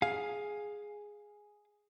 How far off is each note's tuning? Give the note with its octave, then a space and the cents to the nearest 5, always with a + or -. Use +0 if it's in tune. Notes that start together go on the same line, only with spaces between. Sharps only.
G#4 +0 F5 +10